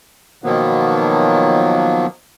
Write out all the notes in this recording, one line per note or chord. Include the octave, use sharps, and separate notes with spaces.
B2 D#3 F3 F#3 A#3 B3